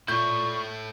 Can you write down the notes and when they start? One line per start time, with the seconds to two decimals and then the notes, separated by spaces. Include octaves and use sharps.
0.08 A#2 A3 E4 C#6 G6